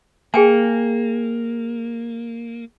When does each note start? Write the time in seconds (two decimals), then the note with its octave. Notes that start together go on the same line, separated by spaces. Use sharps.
0.34 A#3 G#4 G5 G#5